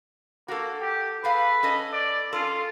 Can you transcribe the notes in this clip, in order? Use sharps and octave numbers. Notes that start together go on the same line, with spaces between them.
A#3 F#4 A4
G4
G#4 A4 B4 F5
C#4 A4 D#5
D5
C#4 F4 A4